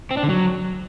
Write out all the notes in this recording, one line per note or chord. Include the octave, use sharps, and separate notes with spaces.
C4
D4
D3
F#3